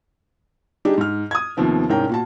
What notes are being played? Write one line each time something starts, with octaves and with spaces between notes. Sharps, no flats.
G3 D4 D#4 G4 G#4
G#2 F6
D#6 G#6
D#2 C3 F3 B3
C2 G#2 C#4 A#4 G5
A#2 F#4 A5